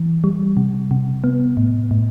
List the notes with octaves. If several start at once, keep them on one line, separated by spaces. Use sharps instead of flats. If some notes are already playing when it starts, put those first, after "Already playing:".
Already playing: E3
G3
C3
C3
B3
A2
A2